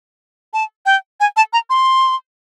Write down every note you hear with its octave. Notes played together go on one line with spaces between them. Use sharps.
A5
G5
G#5
A5
A#5
C6